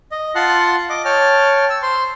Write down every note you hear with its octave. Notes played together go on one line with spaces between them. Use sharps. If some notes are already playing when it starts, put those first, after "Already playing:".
D#5
F4 F#5 A5 C6 F#6
D#5 D6
C#5 G5 A5 F6
E6
C5 C6